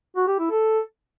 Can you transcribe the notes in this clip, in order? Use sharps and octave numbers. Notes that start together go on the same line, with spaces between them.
F#4
G4
E4
A4